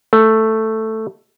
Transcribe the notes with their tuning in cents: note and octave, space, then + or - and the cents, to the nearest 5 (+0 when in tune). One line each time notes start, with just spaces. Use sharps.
A3 +5